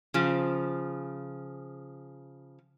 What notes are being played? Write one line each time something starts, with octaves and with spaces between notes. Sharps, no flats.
C#3 F3